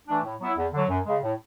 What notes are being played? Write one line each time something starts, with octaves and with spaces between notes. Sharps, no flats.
E3 A3 D4
A2
F#3 B3 E4
E2
D3 F#3
F#2
C#3 G#3
A2